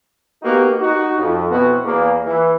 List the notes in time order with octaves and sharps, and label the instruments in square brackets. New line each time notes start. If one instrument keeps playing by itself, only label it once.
[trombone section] A#3 B3 D#4 F#4 G4
D#4 F#4
F2
B2 B3 C4 E4 F#4
E2 A#3
E3